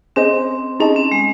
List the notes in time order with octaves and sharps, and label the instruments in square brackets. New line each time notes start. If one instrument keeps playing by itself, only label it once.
[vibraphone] C4 [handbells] C#4 G#4 C5 D#5
[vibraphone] C#4 [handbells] D#4 G#4 D#5 A5
[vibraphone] C4
G#3